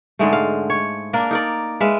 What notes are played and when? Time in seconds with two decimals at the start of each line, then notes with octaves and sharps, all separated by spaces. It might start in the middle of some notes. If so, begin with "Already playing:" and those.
0.19 G#2 D3 G#3 A3
0.33 F5
0.70 C#5
1.13 A#3 D4 A#4
1.31 D#4 A#4 D5
1.81 G#3 B4 E5 F5